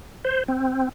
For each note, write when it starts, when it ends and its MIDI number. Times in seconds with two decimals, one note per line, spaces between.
0.25 0.43 72
0.48 0.89 60